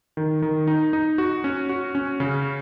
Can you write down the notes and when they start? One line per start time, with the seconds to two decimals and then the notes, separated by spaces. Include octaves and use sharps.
0.17 D#3
0.42 D#3
0.67 D#4
0.93 D#4
1.18 F#4
1.44 C#4
1.69 F#4
1.95 C#4
2.20 C#3